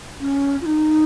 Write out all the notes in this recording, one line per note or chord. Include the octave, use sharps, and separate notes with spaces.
C#4
F4
D#4